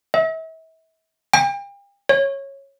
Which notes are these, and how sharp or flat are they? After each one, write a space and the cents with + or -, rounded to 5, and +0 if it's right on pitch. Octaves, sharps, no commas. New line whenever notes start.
E5 -35
G5 +40
C#5 -10